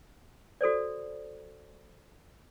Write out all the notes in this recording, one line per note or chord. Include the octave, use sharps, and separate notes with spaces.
F#4 A4 C5 D5